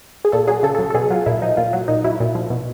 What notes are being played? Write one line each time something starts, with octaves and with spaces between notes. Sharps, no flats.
G#4
A#2 A4
F#3 G#4
C#3 A4
A4
F#3
A4
B2 G#4
F#3 F4
A#2 E4
F3 D#4
A#2 F4
F#3
A#2 D#4
F#3 E4
A#2
F3
B2